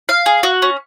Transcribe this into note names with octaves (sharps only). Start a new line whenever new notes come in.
F5
G#4
F#4
C#4